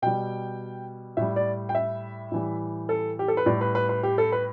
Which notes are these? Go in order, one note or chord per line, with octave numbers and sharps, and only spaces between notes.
B2 G3 G5
A2 G3 E5
D5
G5
E5
A2 E3 G3
A4
G4
A4
B4
A2 G3 D5
B4
B4
B4
G4
A4
B4